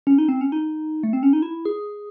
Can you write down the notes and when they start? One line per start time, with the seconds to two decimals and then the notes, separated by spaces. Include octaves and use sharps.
0.07 C#4
0.18 D#4
0.29 C4
0.41 C#4
0.52 D#4
1.03 A3
1.13 C4
1.23 C#4
1.33 D#4
1.42 E4
1.65 G#4